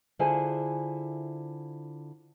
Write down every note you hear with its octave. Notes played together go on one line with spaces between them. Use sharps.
D3 E4 F4 G#4 C5 G#5